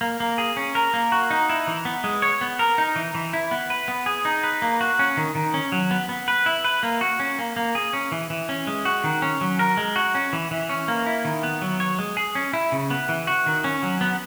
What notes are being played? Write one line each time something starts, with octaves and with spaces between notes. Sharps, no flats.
A#3
A#3
G#4
C#4
A#4
A#3
F#4
D#4
E4
E3
B3
G#3
C#5
B3
A#4
D#4
E3
E3
E4
B3
B4
B3
G#4
D#4
B4
A#3
F#4
C#4
D#3
D#3
C#4
F#3
B3
B3
B4
E4
B4
A#3
F#4
C#4
A#3
A#3
G#4
C#4
E3
E3
C#4
G#3
F#4
D#3
C#4
F#3
A#4
G#3
F#4
C#4
E3
E3
C#4
A#3
E4
D#3
B3
F#3
C#5
G#3
G#4
C#4
E4
C#3
B3
E3
F#4
D#3
C#4
F#3
B3